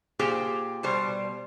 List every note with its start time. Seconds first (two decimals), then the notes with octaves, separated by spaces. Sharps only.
0.19 A#2 G4 G#4 C5 G5
0.83 B2 G3 C5